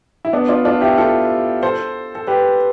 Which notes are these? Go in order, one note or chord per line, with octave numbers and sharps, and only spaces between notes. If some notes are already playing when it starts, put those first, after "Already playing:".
E4
B3 D4
D4 F4
D4 F4
E4 G4
F4 A4
A4 C5
A4
G4 B4